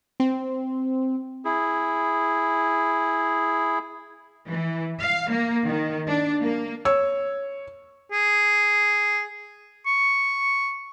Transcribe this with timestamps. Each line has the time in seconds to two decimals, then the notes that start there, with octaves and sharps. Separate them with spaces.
0.20 C4
1.45 E4 G#4
4.49 E3
5.01 F5
5.30 A#3
5.65 D#3
6.07 D4
6.41 A#3
6.85 C#5 E6
8.12 G#4
9.87 C#6